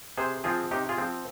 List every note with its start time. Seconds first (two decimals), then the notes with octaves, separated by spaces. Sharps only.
0.17 C3 G#4 C5
0.44 F3 C4 F4 G#4
0.71 C3 D#4 G4
0.89 F4 G#4
0.98 F3 C4